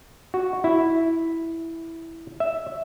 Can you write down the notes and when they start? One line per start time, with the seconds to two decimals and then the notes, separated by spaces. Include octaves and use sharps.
0.34 F#4
0.64 E4
2.40 E5